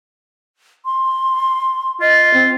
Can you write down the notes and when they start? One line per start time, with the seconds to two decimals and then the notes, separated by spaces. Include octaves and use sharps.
0.85 C6
2.01 F4 D#5
2.34 C4